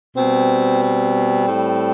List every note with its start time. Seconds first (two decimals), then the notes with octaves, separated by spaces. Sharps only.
0.15 B2 G3 C4
0.81 C4
1.47 A2 G3